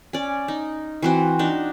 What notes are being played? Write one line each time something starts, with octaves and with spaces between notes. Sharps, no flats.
C#4 D5
D#4
E3 C4 F#4
D4 D#4